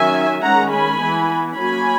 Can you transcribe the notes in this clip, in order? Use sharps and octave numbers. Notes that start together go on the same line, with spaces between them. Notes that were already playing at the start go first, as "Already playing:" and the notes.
Already playing: D#3 F#3 C#4 E5 G#5
D#3 G#3 C#4 F#5 A#5
G#5 B5
E3 B3
F#3 A#3 C#4 G#5 B5